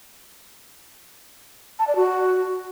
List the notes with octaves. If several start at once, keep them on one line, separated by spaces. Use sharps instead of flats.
A5
D5
F#4